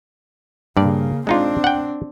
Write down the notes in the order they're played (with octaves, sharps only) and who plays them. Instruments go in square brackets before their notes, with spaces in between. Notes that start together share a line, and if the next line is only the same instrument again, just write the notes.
[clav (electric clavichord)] G2 D5 [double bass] C#3 A#3
[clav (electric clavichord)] G#3 D#4 F4 [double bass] C4 D4
[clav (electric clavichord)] F#5 G5